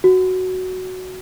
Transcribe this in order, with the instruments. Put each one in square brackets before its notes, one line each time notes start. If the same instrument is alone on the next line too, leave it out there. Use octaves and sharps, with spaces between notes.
[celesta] F#4